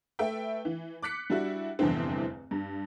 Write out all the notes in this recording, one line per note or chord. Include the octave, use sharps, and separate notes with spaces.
A3 B4 E5 G5
E3
D6 F#6 B6 C#7
G3 D4 E4 F#4
F1 E2 G2 D3 E3 C4
G2